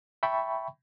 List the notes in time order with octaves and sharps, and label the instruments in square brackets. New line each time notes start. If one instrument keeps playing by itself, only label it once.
[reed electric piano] E5 G5 A5 B5 C#6